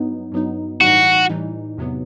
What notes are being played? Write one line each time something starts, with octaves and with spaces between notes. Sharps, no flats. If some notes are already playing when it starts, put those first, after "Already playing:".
Already playing: G2 F#3 B3 D#4
G2 F#3 B3 D#4
A2 E3 G3 D#4 F#4
A2 E3 G3 D#4
E2 C3 F#3 B3